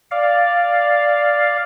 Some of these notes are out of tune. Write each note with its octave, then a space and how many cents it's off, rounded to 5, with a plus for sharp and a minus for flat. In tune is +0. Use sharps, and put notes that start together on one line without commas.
D5 +0 F5 +0